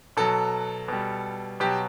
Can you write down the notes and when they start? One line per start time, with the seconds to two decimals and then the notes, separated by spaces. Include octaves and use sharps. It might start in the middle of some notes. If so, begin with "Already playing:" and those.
0.17 B2 F#3 A4
0.88 B2 G3
1.60 B2 F#3 G4